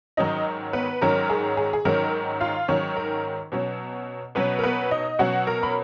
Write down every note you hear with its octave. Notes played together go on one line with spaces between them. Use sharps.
G#2 D#3 F#3 C#4 D#4 D#5
B3 B4
G#2 D#3 F#3 C#4 A#4
G#4
G#4
G#4
G#2 D#3 F#3 C#4 A#4
F4 F5
G#2 D#3 F#3 C#4 C#5
A#4
B2 F#3 C#4
B2 F#3 B3 C#4 B4
A#4
B3 B4
D#4 D#5
B2 F#3 C#4 F#4 F#5
A#4 A#5
B5